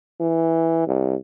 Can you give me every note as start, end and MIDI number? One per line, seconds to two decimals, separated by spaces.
0.21 0.87 52
0.87 1.15 36